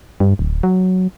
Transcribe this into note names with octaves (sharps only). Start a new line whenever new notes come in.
G2
D1
F#3